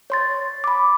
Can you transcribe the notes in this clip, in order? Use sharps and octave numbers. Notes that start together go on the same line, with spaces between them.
C#5 C6 A6
B5 D6